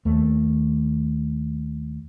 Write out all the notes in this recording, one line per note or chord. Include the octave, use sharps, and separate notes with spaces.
D#2 A3